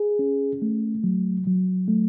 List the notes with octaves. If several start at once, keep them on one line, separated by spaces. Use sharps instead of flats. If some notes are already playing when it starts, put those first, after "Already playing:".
Already playing: G#4
C#4
A3
F#3
F#3
A3